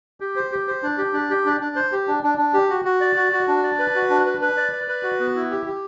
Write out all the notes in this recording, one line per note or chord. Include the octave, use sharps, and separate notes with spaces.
G4
C5
G4
C5
D4
G4
D4
G4
D4
D4
C5
G4
D4
D4
D4
G4
F#4
F#4
D5
F#4
F#4
D4
D5
B4
F#4
D4
B4
B4
D5
D5
B4
F#4
B3
E4
G4
G4